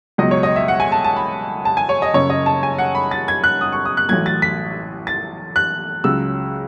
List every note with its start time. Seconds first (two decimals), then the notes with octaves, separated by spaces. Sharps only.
0.18 C#2 B2 F#3 D#5
0.31 C#5
0.43 D#5
0.56 E5
0.68 F#5
0.80 G#5
0.92 A5
1.04 A5
1.16 B5
1.65 A5
1.77 G#5
1.89 C#5
2.02 D#5
2.14 F#1 F#2 C#3 C#5
2.30 D#5
2.46 A5
2.63 G#5
2.78 F#5
2.95 B5
3.11 A6
3.28 G#6
3.44 F#6
3.61 D#6
3.72 C#6
3.85 D#6
3.97 F#6
4.09 A1 A2 F#3 G#6
4.26 A6
4.42 B6
5.07 A6
5.56 F#6
6.04 C#2 C#3 F#3 E6